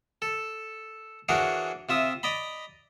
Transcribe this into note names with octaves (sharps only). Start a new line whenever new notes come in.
A4
E3 D4 F#4 G#4 A#4 C#5
C3 F4 E5 D#6
D5 D#5 A#5 B5